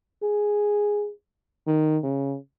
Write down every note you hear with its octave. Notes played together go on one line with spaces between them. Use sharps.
G#4
D#3
C#3